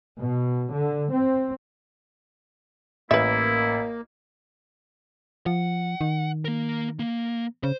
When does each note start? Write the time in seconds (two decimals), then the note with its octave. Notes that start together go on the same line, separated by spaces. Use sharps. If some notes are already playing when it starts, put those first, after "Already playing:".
0.19 B2
0.71 D3
1.11 C4
3.11 A1 A#3 E4 B4 E5
5.46 F3 F#5
6.01 D#3
6.45 A#3 A#4
6.99 A#3
7.64 C#3 C5